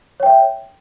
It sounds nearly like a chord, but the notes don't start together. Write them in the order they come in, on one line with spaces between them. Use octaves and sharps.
C#5 G5 E5